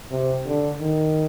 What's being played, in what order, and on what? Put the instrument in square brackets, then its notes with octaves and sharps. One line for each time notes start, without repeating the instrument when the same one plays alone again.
[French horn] C3
D3
D#3